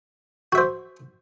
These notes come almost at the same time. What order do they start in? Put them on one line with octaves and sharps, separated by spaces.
F#4 E5 C5